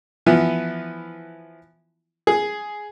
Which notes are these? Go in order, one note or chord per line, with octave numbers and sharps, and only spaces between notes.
E3 F3 B3 E4
G#4